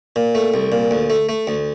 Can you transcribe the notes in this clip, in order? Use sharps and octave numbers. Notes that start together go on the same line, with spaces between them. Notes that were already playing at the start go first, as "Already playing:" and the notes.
A#2
A3
C2
A#2
D2
A3
A3
D2